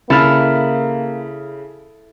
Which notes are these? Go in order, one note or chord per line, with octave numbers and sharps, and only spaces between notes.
C#3 A#3 E4 A4 F6